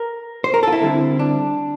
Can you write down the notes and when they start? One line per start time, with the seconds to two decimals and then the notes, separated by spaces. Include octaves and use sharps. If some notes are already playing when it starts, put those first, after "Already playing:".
Already playing: A#4
0.44 C5
0.54 A#4
0.63 F4 A4
0.72 E4
0.82 D3 G3 C4
1.19 D4